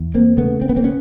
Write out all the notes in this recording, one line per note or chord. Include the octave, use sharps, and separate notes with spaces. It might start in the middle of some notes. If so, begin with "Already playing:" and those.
Already playing: E2
A#3 C4
C#3 A3 B3
C4
B3
A#3 C4
B3 C#4